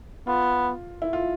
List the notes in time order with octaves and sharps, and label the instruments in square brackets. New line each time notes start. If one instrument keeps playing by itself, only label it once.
[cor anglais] B3 [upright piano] F4
[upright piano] E4
F4